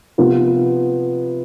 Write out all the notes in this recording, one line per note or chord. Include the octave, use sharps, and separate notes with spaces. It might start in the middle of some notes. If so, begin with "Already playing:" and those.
C3 F3 B3 F4 B4